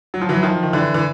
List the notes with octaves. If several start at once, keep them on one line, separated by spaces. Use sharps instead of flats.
F#3
F3
E3 F#3
D#3 F3
D#3
D3 E3
E3